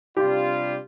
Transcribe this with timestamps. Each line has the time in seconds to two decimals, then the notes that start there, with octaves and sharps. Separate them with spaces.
0.16 C3 G3 D4 F4 G4